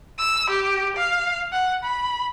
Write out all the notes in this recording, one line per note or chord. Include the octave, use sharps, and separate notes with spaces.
E6
G4
F5
F#5
B5